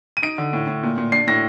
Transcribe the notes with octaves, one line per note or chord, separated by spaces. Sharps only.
D#7
D#4 D7
D3
A2
A2
A#2
A#2
D4 C7
A2 A#6